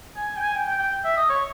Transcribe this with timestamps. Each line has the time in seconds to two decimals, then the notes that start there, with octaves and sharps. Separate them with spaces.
0.16 G#5
0.37 G5
0.42 G#5
0.54 G5
0.67 G5
0.79 G5
1.05 E5
1.17 D#5
1.30 C#5